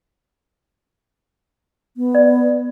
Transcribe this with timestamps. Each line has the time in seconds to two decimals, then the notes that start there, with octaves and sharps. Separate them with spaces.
1.97 B3
2.15 D5